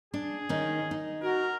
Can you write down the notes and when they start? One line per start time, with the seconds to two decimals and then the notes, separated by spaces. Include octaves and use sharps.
0.14 D4 G#4
0.49 D#3 C#4 D#4
0.91 D#4
1.23 F#4 A#4